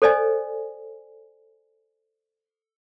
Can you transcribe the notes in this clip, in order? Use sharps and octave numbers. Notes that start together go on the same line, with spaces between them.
A4 C5 D5 D#5 G#5